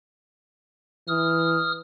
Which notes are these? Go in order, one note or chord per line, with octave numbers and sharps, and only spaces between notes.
E3 D#6 F6